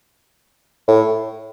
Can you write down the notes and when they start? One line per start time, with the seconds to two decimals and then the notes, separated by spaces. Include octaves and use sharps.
0.88 A2